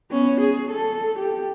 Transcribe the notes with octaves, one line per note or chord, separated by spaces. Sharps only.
B3 C#4
G#4
A4
G4